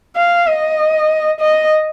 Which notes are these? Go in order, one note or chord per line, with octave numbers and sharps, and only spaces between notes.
F5
D#5
D#5